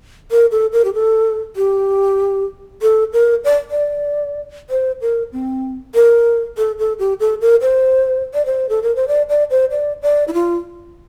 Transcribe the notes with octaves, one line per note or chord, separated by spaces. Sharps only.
A#4
A4
A#4
G4
A4
G4
A4
A#4
D5
D5
C5
A#4
C4
A#4
A4
A4
G4
A4
A#4
C5
D5
C5
A4
A#4
C5
D5
D5
C5
D5
D5
E4
F4